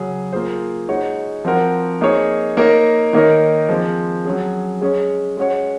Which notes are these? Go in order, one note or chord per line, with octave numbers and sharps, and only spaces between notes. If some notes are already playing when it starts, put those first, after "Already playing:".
Already playing: C#3 F#3 C#4 G#4
A#3 F4 G#4 C5
G#3 D#4 F#4 C#5
F3 C4 F#4 A#4
A#3 D#4 G#4 C#5
A#3 D#4 A#4 C#5
D#3 A#3 D#4 A#4 C#5
F3 G#3 C4
F#3 C#4 G#4
G#3 C#4 G#4 C#5
G#3 C#4 F#4 C#5